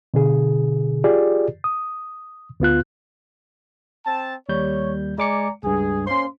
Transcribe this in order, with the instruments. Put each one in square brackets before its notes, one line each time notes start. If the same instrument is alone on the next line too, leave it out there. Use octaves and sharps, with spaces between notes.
[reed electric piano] B2 D3 G#4
F4 G4 G#4 D5
D#6
D2 B3 F4 F#6
[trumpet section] C4 A5
[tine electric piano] D#2 G3 G6 [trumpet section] C#5
[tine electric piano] G#3 D6 C#7 [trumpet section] D5 G#5 A#5
[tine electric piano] C#2 G2 [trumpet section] G#4
[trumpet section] A#3 C6 [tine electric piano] C#4 C5